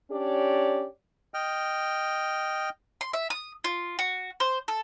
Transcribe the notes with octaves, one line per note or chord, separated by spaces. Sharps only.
C#4 D4 G4 C#5 D5
D#5 G5 F6
C6
E5
D#6
F4
F#4
C5
A4